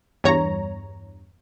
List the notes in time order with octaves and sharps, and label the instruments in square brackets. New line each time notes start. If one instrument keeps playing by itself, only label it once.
[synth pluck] E2 G2 C#5 A#5